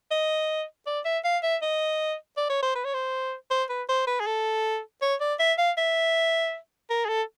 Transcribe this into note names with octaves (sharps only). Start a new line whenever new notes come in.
D#5
D5
E5
F5
E5
D#5
D5
C#5
C5
B4
C#5
C5
C5
B4
C5
B4
G#4
A4
C#5
D5
E5
F5
E5
A#4
G#4
A4